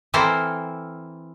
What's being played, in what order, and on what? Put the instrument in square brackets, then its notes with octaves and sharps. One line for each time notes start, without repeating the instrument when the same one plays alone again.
[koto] E3 C4 E4 A4 A#4 C5